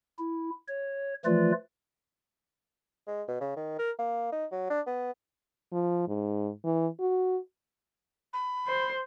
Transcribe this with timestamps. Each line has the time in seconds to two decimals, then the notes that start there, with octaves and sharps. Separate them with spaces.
0.19 E4
0.68 C#5
1.25 E3 F3 A3 F4 B4 D5
3.07 G#3
3.28 B2
3.41 C#3
3.56 D#3
3.79 A#4
3.99 A#3
4.32 D#4
4.51 F#3
4.70 D4
4.86 B3
5.72 F3
6.08 G#2
6.65 E3
7.00 F#4
8.33 B5
8.67 C5